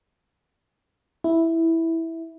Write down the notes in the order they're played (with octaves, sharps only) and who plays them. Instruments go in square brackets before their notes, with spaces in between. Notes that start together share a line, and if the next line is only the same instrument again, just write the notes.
[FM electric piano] E4